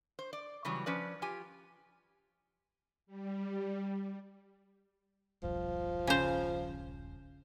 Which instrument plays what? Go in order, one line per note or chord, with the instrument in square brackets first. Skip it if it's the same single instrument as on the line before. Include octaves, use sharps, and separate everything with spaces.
[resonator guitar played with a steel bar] C5
D5
C#3 E3 F#3 G3
F3 C#4 B4 D5
F4 G4 G#5
[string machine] G3
[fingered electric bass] D#1 B1 G2 [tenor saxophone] F3
[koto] C#3 C5